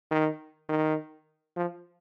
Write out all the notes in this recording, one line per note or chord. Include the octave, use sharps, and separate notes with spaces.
D#3
D#3
F3